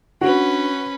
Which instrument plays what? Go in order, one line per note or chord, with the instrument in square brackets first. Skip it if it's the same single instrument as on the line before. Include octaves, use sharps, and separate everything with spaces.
[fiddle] C#4 B4 [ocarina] D4 [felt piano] F#4